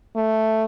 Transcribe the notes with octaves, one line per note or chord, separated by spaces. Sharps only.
A3